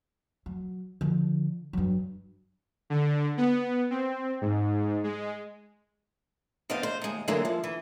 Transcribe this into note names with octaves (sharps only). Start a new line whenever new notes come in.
F#3
D3 F3
G2 F#3
D3
B3
C4
G#2
G#3
E2 B3 D4 C5 D#5 F5
C5
D#2 G#3
D3 E3 F#3 G#3 A#3
F3
E3